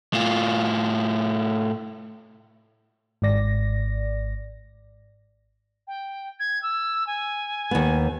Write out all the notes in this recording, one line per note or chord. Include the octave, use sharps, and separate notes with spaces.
A2 F4
G#1 G#2 D5 A#6
G5
G#6
E6
G#5
D#2 B3